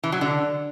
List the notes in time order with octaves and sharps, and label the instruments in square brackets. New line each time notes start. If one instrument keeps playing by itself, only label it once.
[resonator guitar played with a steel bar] E3
F#3
D3